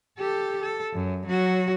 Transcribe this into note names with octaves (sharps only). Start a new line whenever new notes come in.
G4 A4
A4
F#2
F#3 F#4